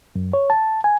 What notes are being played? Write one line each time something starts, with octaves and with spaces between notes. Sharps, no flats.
F#2
C#5
A5
G#5